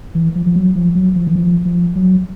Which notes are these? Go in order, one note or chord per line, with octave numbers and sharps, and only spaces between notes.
E3
F3
F3
F#3
F3
F#3
F3
E3
F3
F3
F#3